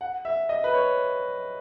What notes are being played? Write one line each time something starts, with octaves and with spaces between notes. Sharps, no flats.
F#5
E5
D#5
B4
C#5